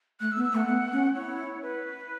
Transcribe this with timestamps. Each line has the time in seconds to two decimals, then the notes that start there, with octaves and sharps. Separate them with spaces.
0.20 A3 F#6
0.32 E6
0.36 B3
0.44 E6
0.52 A3
0.56 F#5
0.67 B3
0.92 C#4
1.15 E4 C#5
1.62 B4